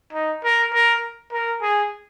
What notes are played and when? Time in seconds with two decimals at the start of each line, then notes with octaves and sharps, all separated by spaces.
0.13 D#4
0.43 A#4
0.73 A#4
1.32 A#4
1.61 G#4